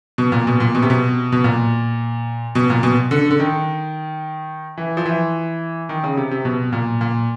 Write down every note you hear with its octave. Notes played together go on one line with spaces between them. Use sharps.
B2
A#2
B2
A#2
B2
C3
B2
B2
A#2
B2
A#2
B2
D3
D3
D#3
E3
F3
E3
D#3
C#3
C3
C3
B2
A#2
A#2